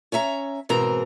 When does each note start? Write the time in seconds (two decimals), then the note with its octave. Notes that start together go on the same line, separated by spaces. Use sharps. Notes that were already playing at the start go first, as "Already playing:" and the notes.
0.12 C#4 C#5 E5 A#5
0.69 G#2 B2 E3 C4 A#4 A#5